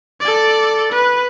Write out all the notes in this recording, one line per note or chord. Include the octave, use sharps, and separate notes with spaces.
A4 D5
B4